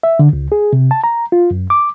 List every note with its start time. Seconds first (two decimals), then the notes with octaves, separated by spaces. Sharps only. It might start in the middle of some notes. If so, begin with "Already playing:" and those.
0.03 E5
0.19 D3
0.33 C#2
0.52 G#4
0.73 C3
0.91 A5
1.04 A#5
1.32 F4
1.51 F#2
1.70 D6